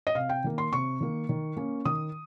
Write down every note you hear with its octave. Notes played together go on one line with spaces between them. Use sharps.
D#5
C3 F5
G5
D#3 A#3
C6
C3 C#6
D#3 A#3
D#3
A#3 C#4
D#3 D#6